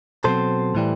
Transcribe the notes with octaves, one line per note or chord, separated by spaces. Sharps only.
B2 F#3 C4 A4 C5
A2 E3 G3